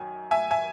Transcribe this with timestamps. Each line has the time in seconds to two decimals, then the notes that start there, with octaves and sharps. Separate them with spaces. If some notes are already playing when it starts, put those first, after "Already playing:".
Already playing: F#2 D#3 F#3 G#5
0.31 E5 G#5
0.51 E5 G#5